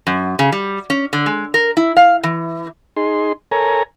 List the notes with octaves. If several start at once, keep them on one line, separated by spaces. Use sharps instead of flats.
F#2
C#3
G3
C#4
D3
G#3
A#4
E4
F5
E3
D#4 G#4 C6
A4 A#4 C#5 G#5 A#5